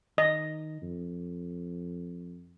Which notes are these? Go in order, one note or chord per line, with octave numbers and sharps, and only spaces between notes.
D#3 D#5
F2